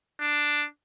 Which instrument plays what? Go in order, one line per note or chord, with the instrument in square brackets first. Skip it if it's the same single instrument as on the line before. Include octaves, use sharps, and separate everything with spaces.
[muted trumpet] D4